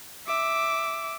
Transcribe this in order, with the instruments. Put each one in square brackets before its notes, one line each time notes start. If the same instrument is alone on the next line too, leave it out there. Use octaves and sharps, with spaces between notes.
[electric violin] E5 D6